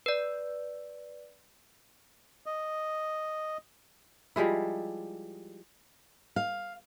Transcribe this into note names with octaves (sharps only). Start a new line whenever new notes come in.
B4 D5
D#5
F3 G3 G#3 E4
F5